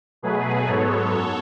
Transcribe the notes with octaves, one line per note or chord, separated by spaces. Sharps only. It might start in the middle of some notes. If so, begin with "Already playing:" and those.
B2 F#3 A3 G#4 B4
G#2 F#3 B3 A4 C#5
F#2